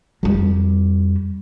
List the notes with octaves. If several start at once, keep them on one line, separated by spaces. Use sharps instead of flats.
F2 G3